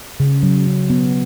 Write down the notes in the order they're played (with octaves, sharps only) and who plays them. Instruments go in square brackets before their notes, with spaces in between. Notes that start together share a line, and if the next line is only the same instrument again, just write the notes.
[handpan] C#3
F#3
C#3
B3